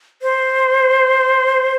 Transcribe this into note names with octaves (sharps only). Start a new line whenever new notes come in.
C5